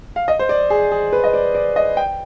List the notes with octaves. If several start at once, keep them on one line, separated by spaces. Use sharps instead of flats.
F5
D#5
C5
D5
G#4
G#4
B4
D#5
D5
D5
D#5
G5